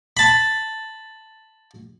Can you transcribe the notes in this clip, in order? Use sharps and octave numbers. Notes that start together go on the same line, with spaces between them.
A5 B5